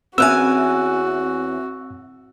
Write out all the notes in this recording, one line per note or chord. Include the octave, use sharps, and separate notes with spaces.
E2 C4 C#4 F#4 E5 G#5 E6 F#6